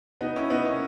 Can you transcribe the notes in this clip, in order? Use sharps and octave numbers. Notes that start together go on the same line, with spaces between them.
B3 D#4
C#4 E4
B3 D#4
A#3 C#4